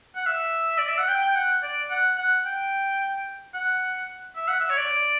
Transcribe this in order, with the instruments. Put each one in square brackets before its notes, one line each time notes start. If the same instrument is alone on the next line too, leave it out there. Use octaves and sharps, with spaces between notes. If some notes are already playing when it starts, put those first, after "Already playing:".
[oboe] F#5
E5
D5
E5
F#5
G5
G5
F#5
D5
F#5
F#5
G5
F#5
E5
F#5
E5
C#5
D5